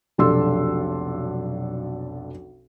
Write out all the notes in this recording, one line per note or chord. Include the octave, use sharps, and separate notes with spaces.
F1 B1 D4 A4 C6 E6